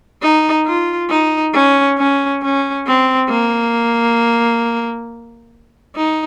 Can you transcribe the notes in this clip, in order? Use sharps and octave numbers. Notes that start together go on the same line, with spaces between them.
D#4
F4
D#4
C#4
C#4
C#4
C4
A#3
D#4